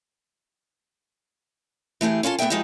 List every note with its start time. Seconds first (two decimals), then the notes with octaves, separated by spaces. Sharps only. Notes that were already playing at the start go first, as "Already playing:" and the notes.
2.01 E3 A3 G4 G#4
2.23 C#4 F4 A4 A5
2.38 A3 B3 G#4 E5 G5
2.50 F3 G#3 D#4 E4 G4